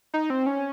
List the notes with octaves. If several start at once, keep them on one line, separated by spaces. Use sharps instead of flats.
D#4
C4
C#4